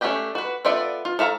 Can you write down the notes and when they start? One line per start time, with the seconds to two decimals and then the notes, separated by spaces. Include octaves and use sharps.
0.01 A3 C#4 D4 G4 G5
0.35 F#4 B4
0.65 B3 F4 A4 D5 E5
1.05 F4
1.19 A4 E5 F5 A5 A#5